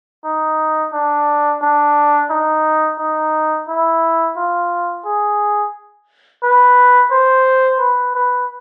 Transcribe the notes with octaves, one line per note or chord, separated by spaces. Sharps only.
D#4
D4
D4
D#4
D#4
E4
F4
G#4
B4
C5
B4
B4